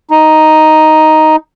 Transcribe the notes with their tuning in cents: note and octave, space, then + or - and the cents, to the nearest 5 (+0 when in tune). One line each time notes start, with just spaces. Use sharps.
D#4 +5